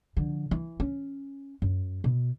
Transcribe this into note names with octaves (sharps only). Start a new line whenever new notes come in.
D3 F3
E3
C#4
F#2
B2